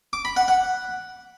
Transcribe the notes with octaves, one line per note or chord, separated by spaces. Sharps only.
D6
B5
F#5
F#5